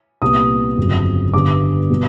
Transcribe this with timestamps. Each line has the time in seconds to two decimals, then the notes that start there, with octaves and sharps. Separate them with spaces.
0.22 C2 A#2 G3 B3 D#6
0.77 G1 F2 C#3 F#3
1.34 G2 D3 G3 B3 D6
1.90 B2 G3 B3